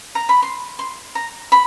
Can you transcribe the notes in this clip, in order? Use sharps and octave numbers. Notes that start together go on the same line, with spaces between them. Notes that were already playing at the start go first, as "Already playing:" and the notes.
A#5
B5
C6
C6
A#5
B5